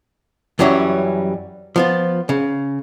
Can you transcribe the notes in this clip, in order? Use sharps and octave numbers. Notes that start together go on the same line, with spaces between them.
F#2 E3 F#3 G3 C#4
F3 B3 F4
C#3